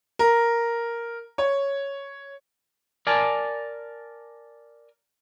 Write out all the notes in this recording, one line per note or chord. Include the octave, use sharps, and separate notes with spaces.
A#4
C#5
A#4 D5 G#5 A5